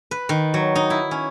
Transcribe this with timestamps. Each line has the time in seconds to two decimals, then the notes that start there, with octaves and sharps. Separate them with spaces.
0.11 B4
0.29 D#3
0.54 F#3
0.75 D#4
0.90 E4
1.11 C#4